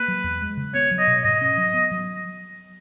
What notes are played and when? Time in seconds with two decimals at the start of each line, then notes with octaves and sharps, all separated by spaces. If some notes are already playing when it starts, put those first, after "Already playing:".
Already playing: A#3 B4
0.08 F#3
0.24 E2
0.42 G#3
0.57 C#3
0.74 B3 C#5
0.91 F#3
0.99 D#5
1.07 B2
1.24 G#2 D#5
1.42 C#4
1.57 F#3
1.74 B3
1.91 F#3